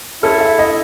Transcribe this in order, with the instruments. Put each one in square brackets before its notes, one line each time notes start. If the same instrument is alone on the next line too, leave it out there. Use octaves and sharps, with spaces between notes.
[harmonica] G#3 C#4 E4 [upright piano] A4
[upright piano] E5
D#5